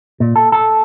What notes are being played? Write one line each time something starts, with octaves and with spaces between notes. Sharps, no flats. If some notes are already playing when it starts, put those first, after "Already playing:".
A#2
A4
A4